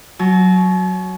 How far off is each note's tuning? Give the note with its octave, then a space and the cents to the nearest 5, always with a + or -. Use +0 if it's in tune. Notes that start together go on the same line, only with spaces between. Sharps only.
F#3 +0 A5 -45